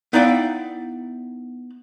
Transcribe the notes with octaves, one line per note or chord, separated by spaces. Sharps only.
B3 D#4 E4 D5 F5 G5